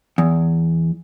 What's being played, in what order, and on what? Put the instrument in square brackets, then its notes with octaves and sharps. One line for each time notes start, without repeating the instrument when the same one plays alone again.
[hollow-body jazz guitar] E2